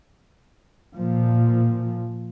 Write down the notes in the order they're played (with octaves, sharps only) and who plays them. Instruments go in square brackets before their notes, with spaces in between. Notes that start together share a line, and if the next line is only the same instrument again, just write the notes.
[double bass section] A#2 F3